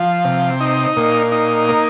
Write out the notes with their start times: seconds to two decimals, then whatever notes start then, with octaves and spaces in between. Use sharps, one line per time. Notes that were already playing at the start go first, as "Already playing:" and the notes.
Already playing: F3
0.25 C3
0.60 D#4
0.97 A#2
1.32 D#4
1.69 A#3